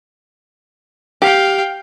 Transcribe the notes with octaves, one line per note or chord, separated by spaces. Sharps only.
G4 F5 G5